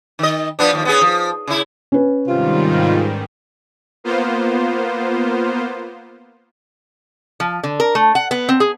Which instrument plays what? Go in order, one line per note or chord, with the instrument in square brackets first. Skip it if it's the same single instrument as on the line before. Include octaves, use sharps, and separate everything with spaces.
[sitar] D#3 D#5
F3 B3 D4
D#2 F3
B3 C#4 G#4
F3
C#3 E4
[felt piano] C#4 B4
[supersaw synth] G#2 D#3 G3 [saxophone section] C3 F4
[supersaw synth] A#3 B3 F4 C5
[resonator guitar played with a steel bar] F3
D3
A#4
A3
F#5
B3
C4
G#4